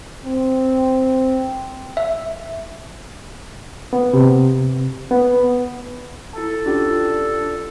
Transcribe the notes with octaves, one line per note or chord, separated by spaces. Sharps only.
C4
E5
B3
C3
B3
E4 A4 A5
C#4 D4 F4 G4